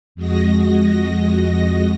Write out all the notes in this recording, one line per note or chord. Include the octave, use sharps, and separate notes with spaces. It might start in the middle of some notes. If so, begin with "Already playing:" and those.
F2 G#3 F#4 D#5 A#6